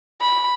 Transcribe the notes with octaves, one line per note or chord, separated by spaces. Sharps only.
B5